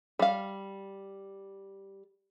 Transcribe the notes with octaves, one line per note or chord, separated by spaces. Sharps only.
G3 F5